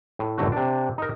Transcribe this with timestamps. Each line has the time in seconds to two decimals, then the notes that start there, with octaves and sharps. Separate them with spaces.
0.19 A2
0.38 G1 D#2 D3 F#3 A3 F#4
0.52 C3 D4
0.98 D#4 A#4